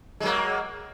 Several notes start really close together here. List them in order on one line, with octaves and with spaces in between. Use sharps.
G#3 F#3 A#3